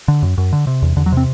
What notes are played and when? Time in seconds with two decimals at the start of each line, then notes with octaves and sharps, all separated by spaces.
0.08 D3
0.23 F#2
0.38 F#2
0.53 D3
0.67 C3
0.82 E2
0.96 E2 D3
1.06 F#3
1.12 C3 C4